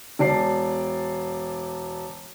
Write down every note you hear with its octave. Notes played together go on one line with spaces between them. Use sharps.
E1 D5 A5 C7